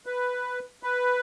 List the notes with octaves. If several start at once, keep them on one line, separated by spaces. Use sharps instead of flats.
B4
B4